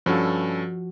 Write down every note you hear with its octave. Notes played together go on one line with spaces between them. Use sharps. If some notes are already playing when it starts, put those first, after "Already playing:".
G2 F3 C#4 F#4 A4